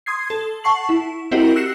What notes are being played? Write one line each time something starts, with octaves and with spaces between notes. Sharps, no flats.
C6 D#6 G#6 C7
A4
F#5 A5 C#6 C7 F#7
E4
C4 E4 F#4 G4 A#4 D#5
E6 F#6 A#6 C7 C#7 E7